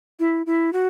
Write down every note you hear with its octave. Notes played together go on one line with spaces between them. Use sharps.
E4
E4
F#4